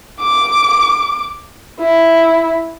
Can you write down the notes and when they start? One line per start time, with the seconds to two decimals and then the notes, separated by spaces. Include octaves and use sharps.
0.20 D6
1.80 E4